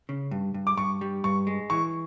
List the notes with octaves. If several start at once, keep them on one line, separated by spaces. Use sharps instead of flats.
C#3
G2
G2
D6
G2 C#6
G3
G2 C#6
G#3
E3 C#6